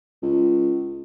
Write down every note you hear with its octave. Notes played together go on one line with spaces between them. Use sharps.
C#2